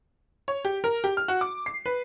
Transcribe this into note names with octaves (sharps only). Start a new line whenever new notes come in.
C#5
G4
A#4
G4
F6
F#4
D6
C7
B4